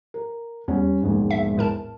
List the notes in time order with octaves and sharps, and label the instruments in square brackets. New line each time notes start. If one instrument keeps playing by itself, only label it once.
[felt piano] A#4
[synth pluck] E2 [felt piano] G3 C#4
[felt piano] E1 A#1 G#2
[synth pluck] E5
A2 A#4 A5